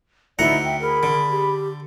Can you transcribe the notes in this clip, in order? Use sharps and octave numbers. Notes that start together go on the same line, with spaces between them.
D2 D#4 E4 D5 F#5 A#5
E5 G5
G#4 A#4 B5
D3
G4